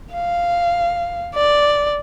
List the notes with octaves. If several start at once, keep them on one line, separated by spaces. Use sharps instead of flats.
F5
D5